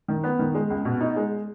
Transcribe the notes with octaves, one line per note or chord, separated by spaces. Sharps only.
D#3
B3
D#3
G#3
C#2
B2
D#4
G#3